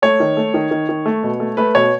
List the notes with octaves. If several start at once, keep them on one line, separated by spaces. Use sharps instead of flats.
A3 C#5
D#3
A3
D#3
D#3
D#3
A3
B2
A3
A3 B4
B2 C#5